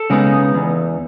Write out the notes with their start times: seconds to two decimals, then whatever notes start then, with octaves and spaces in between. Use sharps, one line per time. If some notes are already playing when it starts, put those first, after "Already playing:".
Already playing: A4
0.10 C#3 G#3 B3 D#4
0.54 E2